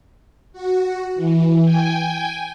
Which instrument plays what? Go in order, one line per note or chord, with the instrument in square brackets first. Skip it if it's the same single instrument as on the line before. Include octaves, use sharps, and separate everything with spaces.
[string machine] F#4
E3
G5 G#5